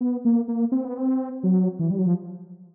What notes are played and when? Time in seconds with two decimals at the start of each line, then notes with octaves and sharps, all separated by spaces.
0.01 B3
0.25 A#3
0.48 A#3
0.72 C4
0.85 B3
0.98 C4
1.43 F#3
1.79 E3
1.91 G3
1.99 F#3
2.06 F3